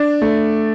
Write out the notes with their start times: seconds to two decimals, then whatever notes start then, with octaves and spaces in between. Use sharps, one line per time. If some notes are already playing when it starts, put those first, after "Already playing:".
Already playing: D4
0.22 A3